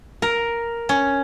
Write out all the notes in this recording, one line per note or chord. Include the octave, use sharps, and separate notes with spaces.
A#4
C#4